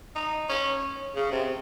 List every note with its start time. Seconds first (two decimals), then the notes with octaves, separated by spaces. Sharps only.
0.15 D#4
0.49 C#4
1.15 C#3
1.31 C3